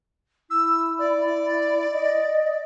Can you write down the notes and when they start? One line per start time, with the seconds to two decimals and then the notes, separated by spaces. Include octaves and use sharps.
0.50 E4 E6
0.98 D5
1.92 D#5